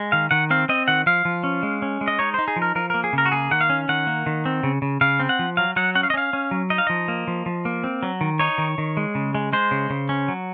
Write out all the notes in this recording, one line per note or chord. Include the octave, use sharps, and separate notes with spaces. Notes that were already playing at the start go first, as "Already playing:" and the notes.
Already playing: G#3
D#3 F5
D#3 F#5
C4 F5
C4 D#5
D#3 F#5
F3 F5
F3
C#4
G#3
C#4
G#3
D#5
D#4 C#5
D#4 C5
G#4
F3
A#4
F3 A#4
A#3 A#4
G#4
C#3
A#4
F#4
A#3 G#4
D#3 F#5
F5
C#4
D#3 F#5
A#3
D#3
C4
C#3
C#3
C#3 F5
C4
F#5
F3
F#3 F5
F#3 F#5
C#4 F#5
F5
D#5
C#4 F5
C#4
F#3
D#4 D#5
F5
F3 D#5
A#3
F3
F3
A#3
C4
F#3
D#3
D#4 C#5
D#3
D#3
G#3
C#3
G#3
G#3 C5
C#3
C#3
C#4
F#3